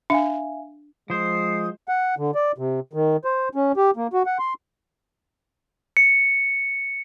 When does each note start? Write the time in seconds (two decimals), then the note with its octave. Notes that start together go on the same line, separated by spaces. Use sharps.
0.10 D4 E5 F5 G#5
1.10 F3 G#3 C5 D#6 C7
1.88 F#5
2.18 D3
2.35 D5
2.58 C3
2.93 D#3
3.24 C5
3.55 C#4
3.77 G4
3.97 A#3
4.13 F#4
4.26 F#5
4.39 C6
5.97 C#7